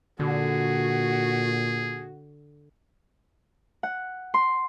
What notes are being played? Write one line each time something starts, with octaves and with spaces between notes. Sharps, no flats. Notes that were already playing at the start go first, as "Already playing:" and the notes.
A#2 D3 F#4 G#4
F#5
C6